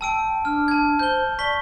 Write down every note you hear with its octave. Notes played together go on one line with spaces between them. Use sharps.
G5 A5 E6 D7
D4 F6
A5 G#6
C5 G6 G7
A5
D5 C#6 B6 G7